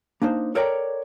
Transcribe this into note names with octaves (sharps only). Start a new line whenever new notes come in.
A#3 D4 D#4 C5
A4 A#4 C#5 D5 G5 A#5